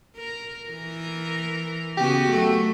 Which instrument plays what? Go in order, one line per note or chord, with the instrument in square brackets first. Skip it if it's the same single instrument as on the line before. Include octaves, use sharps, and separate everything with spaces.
[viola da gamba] A#4
E3 A#4
[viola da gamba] C#3 B3 F#4 [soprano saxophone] G4
[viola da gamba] F#2 A3